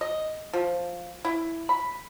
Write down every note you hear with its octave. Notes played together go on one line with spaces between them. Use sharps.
D#5
F3
E4
B5